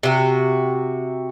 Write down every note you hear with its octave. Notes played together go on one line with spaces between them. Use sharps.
C3 F#4